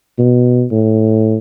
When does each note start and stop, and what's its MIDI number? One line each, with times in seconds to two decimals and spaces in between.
0.18 0.65 47
0.71 1.38 45